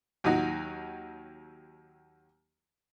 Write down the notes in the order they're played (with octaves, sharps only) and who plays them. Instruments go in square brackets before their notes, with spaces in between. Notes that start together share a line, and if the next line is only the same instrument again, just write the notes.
[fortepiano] D#2 F#3 D#4 F#4